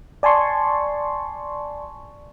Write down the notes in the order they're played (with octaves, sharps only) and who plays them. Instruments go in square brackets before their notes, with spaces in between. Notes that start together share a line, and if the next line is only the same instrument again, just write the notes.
[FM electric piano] D5 G#5 A5 C6 C#6